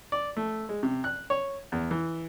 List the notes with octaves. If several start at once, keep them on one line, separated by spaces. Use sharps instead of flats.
D5
A3
G#3
C3
F#6
C#5
E2
E3